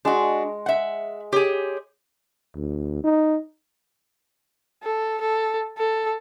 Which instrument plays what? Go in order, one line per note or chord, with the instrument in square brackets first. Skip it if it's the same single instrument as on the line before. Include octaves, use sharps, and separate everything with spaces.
[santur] G#3 [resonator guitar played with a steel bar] D4 F#4
[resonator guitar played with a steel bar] E5 F#5
[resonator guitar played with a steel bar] G4 G#4 [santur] C#5
[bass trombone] D2
D#4
[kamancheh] A4
A4
A4